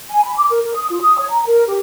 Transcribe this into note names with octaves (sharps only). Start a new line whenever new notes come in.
G#5
B5
D6
A#4
A#4
D#6
F4
D#6
C#5
A#5
A#4
G4